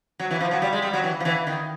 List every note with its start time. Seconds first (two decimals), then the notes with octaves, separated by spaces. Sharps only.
0.20 F#3
0.31 E3
0.40 F3
0.51 F#3
0.62 G3
0.73 G#3
0.82 G3
0.93 F#3
1.04 E3
1.20 F3
1.25 E3
1.47 D#3